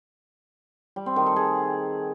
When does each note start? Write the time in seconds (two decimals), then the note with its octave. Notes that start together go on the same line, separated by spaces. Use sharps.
0.96 G3
1.06 C4
1.16 D#3
1.26 A4
1.36 G#4